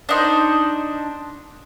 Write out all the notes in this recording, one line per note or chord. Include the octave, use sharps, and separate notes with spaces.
D4 D#4 C5